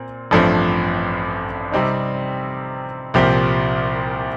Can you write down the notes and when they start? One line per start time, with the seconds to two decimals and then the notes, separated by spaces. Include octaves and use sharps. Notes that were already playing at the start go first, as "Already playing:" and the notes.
Already playing: A#2 C4
0.31 A1 G2 F3 A3 C4
1.72 C3 G3 C4 D#4
3.14 C2 A#2 F3 C4 G4